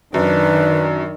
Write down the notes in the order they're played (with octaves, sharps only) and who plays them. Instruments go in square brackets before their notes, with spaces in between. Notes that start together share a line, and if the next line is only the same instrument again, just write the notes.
[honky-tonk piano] F#2 [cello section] D#3 [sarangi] D4 [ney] B4